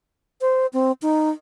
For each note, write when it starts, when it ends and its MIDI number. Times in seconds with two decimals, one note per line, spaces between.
0.41 0.66 72
0.73 0.92 60
1.02 1.30 63